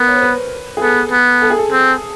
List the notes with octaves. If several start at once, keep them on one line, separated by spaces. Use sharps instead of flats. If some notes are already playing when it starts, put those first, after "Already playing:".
Already playing: B3 A#4
C#5
C5
B4
G#4
B3 A4
B3
A4
G#4
A4
C4